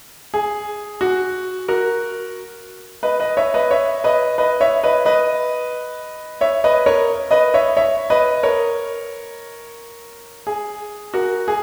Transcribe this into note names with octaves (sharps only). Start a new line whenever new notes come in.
G#4
F#4
F#4 A#4
B4 D#5
B4 D#5
C#5 E5
B4 D#5
C#5 E5
B4 D#5
B4 D#5
C#5 E5
B4 D#5
B4 D#5
C#5 E5
B4 D#5
A#4 C#5
B4 D#5
C#5 E5
C#5 E5
B4 D#5
A#4 C#5
G#4
F#4 A#4
G#4